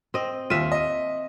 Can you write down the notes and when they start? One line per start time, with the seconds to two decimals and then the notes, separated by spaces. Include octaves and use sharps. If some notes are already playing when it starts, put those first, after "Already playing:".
0.14 C4 D#5
0.50 D#2 F4 E5 D#7
0.72 D#5